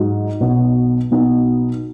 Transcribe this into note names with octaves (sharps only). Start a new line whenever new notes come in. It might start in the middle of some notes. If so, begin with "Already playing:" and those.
Already playing: G#2 F#3 D#4 F#4
B1 B2 B3
B1 B2 B3 D#4